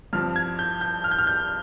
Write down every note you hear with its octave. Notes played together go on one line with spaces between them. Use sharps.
G2 F3 C4 F6
G#6
G6
G6
F6
G6
F6
G6